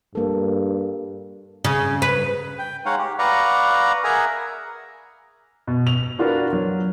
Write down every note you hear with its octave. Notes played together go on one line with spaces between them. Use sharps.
G2 A#3 A4
C#3
B4
G5
G#3 D#4 C#5 F5 F#5
G4
B4 D5 F5 F#5 A#5 C#6
G#4 A#4 E5 F#5 G#5 A#5
B2
F7
D4 F4 F#4 A#4 B4
F#3